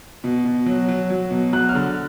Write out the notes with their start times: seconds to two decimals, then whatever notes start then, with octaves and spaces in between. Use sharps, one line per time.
0.24 B2
0.45 B2
0.66 F#3
0.89 F#3
1.10 F#3
1.31 B2
1.53 F#3 F#6
1.69 F6
1.75 D3